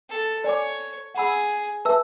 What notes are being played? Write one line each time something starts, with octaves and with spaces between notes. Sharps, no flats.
A4
C#5 D5 G#5 D6
G#4 F#5 B5 E6
B4 E5 A5 E6